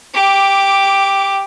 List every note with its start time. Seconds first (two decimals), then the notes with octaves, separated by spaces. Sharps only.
0.14 G4 D6